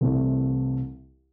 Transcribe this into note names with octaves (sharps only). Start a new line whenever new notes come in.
C2 C3 E3 A3